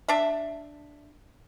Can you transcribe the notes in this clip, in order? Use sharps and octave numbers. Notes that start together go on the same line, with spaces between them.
D4 E5